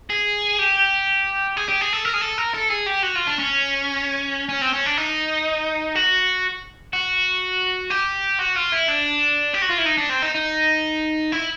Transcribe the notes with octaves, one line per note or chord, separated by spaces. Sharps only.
G#4
G4
G#4
G4
G#4
A4
A#4
G#4
A4
A#4
A4
G#4
G4
F#4
F4
D4
C#4
C#4
C4
C#4
D4
D#4
F#4
F#4
G4
F#4
F4
E4
D4
G4
F#4
F4
E4
D#4
D4
C4
D#4
D#4
E4